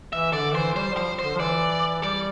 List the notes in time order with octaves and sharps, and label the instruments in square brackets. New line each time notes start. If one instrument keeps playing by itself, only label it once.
[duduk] E3 [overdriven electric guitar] E5
[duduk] D3 [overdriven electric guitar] D5
[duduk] E3 [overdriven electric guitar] C5
[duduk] G3 [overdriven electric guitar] C5
[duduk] F3 [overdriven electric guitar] C5
[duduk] D3 [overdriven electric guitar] C5
[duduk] F3
[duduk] E3 [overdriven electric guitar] D5
[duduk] G3 [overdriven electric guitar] D5